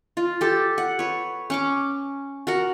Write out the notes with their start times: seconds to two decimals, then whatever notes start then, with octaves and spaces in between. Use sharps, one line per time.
0.17 F4
0.41 G4 A4
0.78 F#5
0.99 B4 C#5
1.50 C#4 C#6 D6
2.47 F#4 A#4 F#5